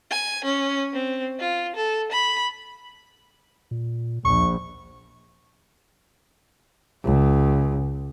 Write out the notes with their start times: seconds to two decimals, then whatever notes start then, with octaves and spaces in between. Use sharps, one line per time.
0.11 G#5
0.44 C#4
0.93 C4
1.40 F4
1.76 A4
2.12 B5
3.71 A#2
4.25 A#1 D#2 C#6
7.04 C#2